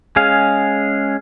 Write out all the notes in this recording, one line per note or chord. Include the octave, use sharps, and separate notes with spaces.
G#3 C#4 G#4 F5